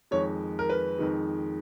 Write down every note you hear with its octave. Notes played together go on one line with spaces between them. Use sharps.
F2 D#3 G#3 C#5
A#4
B4
F2 D#3 G#3